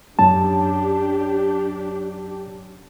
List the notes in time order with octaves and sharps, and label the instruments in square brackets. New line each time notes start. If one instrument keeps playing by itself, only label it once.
[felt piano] F#2 [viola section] D4 G4 [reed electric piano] A5